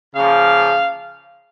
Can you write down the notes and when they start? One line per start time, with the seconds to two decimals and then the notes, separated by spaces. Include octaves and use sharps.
0.14 C#3 F3 A#3 F5